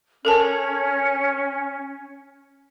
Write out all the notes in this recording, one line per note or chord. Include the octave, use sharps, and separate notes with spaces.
C#4 A4 A#4 A5